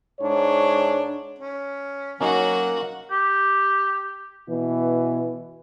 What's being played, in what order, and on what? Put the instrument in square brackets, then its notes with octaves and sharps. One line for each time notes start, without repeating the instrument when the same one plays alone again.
[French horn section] G#2 D4 C#5
[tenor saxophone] C#4
[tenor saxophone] F#3 [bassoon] A#3 [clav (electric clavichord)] C#4 D#4 [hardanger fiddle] F#4 F#5
[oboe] G4
[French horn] B2 [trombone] E3